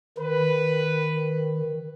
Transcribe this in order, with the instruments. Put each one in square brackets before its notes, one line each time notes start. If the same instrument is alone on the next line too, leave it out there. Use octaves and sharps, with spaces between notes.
[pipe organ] D#3 [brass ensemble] B4